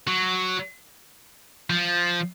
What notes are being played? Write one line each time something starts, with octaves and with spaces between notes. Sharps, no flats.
F#3
F3